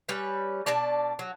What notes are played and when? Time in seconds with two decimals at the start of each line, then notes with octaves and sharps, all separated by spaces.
0.08 G3 C#4 B4
0.66 B2 D4 D5 A5
1.19 F#3